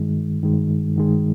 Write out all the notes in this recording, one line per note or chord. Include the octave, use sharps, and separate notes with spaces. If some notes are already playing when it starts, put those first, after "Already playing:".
Already playing: G2 D#3 G#3
G2 D#3 G#3
G2 D#3 G#3